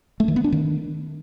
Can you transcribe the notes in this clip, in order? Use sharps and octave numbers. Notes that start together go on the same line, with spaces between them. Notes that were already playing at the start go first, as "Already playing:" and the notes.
A3
D#3
B3
D4
D#3